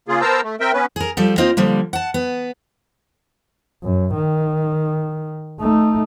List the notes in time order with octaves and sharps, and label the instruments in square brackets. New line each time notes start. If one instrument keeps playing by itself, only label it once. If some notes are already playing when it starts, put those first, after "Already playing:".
[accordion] C#3 A#3 F4 G#4
B3 A#4 C5 A5 A#5 E6
A3
C4 A#4 E5 G5
B3 C#4 B4
[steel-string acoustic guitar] G#4 A#4
F3 G3 A4
A#3 C4 D#4 F4 D#5
D3 F3 G3 A#3
F#5 A5
B3
[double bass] F#2
D#3
A3 D#4